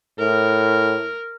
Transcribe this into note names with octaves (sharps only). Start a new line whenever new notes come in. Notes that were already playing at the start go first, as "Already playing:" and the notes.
A2 A#4